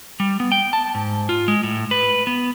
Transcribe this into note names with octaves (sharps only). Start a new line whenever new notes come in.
G3
B3
G5
A5
G#2
F4
G#3
A2
B4
B3